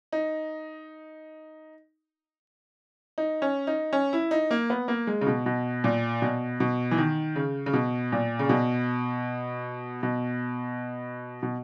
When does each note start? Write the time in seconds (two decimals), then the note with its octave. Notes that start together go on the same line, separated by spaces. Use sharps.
0.12 D#4
3.18 D#4
3.42 C#4
3.67 D#4
3.93 C#4
4.13 E4
4.31 D#4
4.51 A#3
4.70 B3
4.88 A#3
5.07 G#3
5.21 C#3
5.27 B2
5.46 B2
5.84 A#2
6.22 B2
6.60 B2
6.91 E3
6.98 D#3
7.36 C#3
7.66 C#3
7.73 B2
8.12 A#2
8.39 C#3
8.49 B2
10.03 B2
11.43 B2